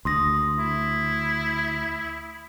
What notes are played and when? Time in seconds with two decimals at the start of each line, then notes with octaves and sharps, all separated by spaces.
0.05 D2 C6 D#6 A#6
0.58 E4